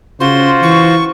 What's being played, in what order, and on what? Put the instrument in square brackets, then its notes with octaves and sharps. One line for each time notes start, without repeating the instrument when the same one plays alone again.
[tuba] C#3 [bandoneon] F4 F#4 C5 [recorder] C6
[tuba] E3 [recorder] C#6